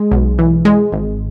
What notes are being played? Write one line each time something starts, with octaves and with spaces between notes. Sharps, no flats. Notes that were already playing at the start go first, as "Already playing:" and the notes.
Already playing: G#3
B1
E3
G#3
G#1